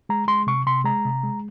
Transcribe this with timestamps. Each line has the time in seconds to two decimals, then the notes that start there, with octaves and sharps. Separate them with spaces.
0.09 G#3 A#5
0.28 G#3 C6
0.47 C3 C#6
0.67 C3 C6
0.85 G#3 A#5
1.05 C3
1.23 G#3